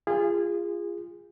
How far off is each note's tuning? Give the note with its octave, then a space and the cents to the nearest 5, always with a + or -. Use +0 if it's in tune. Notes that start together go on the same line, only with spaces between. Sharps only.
F4 -20 G#4 -30